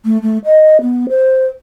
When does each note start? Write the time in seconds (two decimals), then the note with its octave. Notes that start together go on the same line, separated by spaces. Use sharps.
0.05 A3
0.22 A3
0.45 D#5
0.81 B3
1.09 C5